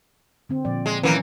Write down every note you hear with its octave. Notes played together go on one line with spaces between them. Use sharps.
D3 C4
A#2 F3 D5
G#3
D#3 E3 F#3 A#3 C#4